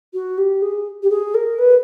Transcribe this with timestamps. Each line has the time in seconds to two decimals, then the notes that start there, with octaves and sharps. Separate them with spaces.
0.13 F#4
0.38 G4
0.62 G#4
1.02 G4
1.10 G#4
1.34 A#4
1.58 B4